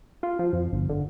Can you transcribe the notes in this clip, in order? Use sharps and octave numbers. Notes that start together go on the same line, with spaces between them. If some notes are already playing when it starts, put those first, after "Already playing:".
F4
F3
F2
G1
D3